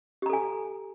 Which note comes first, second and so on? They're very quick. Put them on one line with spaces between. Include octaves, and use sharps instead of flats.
G4 A#5 A4 G#5